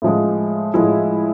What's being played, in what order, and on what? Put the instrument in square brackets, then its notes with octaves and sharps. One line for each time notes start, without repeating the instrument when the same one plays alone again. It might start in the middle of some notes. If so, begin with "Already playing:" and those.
[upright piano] A2 F3 G#3
A2 F3 G#3 E4